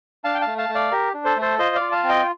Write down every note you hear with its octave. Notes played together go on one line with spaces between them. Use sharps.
D4 F5 A5
G5
F5 A5
A3
F5 A5
A3
D5 F5
G4 A#4
D4
A4 C5
A3
A4 C5
F4 C5 D#5
D5 F5
F4
F5 A5
C4
D#5 G5